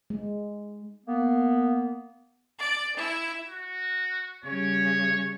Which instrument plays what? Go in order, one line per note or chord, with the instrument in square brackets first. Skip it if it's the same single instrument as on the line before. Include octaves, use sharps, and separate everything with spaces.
[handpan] G#3
[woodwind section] A#3 B3
[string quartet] D5
E4
[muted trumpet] F#4
[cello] C#3 G3 [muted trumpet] C#5